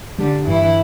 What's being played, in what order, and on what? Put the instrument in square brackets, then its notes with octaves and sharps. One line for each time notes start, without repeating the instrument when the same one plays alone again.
[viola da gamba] D3 D4 [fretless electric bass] G3
[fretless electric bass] G2 [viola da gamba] E3 E4